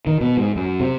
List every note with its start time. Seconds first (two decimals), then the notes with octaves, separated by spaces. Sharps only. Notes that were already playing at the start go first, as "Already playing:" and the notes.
0.07 D#3
0.21 B2
0.37 G#2
0.56 F#2
0.80 C3